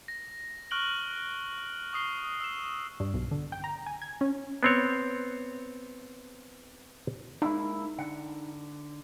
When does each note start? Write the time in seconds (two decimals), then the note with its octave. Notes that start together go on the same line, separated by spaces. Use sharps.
0.08 A#6
0.71 C#6 F6 F#6 D7 F#7 G7
1.93 C#6 D#6 C7 G7
2.40 E6 E7
3.00 G2
3.14 B1
3.31 D3
3.52 G5
3.64 A#5
3.86 G#5
4.02 G#6
4.21 C#4
4.63 B3 C4 C#5
7.42 G#3 A#3 D#4 E4
7.98 D3 F#5